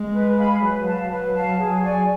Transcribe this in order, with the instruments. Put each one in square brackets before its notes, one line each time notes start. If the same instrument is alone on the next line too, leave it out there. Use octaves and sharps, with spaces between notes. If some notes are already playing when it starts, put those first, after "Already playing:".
Already playing: [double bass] G#3
[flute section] B4
F5 G#5 B5
[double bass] F#3 [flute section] B4
[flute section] F5 A5
[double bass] F#3 [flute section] B4
[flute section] F5 A5
G#4
D5 G#5 C#6